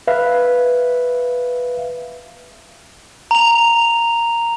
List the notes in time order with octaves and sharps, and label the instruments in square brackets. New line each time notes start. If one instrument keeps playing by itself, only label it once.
[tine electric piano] B4 E5 F5
[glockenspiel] A#5 F7